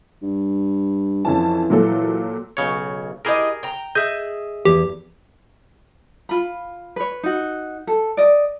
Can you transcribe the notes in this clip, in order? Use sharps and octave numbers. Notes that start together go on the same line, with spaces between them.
G2
F2 E3 C#4 A5
A#2 F#3 A4
B1 C#3 C#5
E4 G4 G#4 A#4 D#5
G5 A#5
G#4 D#5 E5 G6
E2 G4
F4 B5
B4 C#5
D#4 F#4
A4
D5 D#5